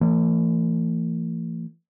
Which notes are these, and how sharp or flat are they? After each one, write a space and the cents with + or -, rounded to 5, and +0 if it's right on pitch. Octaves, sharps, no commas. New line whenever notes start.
E3 +35 A#3 -45